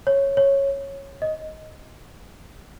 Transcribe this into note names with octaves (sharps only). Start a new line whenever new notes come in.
C#5
C#5
D#5